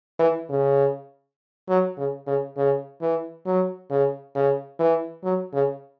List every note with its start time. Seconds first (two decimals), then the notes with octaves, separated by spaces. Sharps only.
0.19 E3
0.49 C#3
1.68 F#3
1.97 C#3
2.27 C#3
2.57 C#3
3.01 E3
3.46 F#3
3.90 C#3
4.35 C#3
4.79 E3
5.24 F#3
5.53 C#3